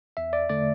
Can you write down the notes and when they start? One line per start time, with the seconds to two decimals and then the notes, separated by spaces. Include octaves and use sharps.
0.17 E2 E5
0.33 D5
0.49 D3 A3 D5